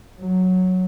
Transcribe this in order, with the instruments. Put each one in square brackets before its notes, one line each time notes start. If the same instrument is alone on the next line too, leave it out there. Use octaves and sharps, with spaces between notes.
[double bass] F#3